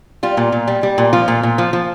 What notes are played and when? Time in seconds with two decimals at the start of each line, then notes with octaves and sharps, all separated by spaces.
0.23 G3 F4
0.37 A#2
0.52 A#2
0.68 G3
0.83 G3
0.98 A#2
1.13 F3 F4
1.28 A#2
1.43 A#2
1.58 F3
1.73 F3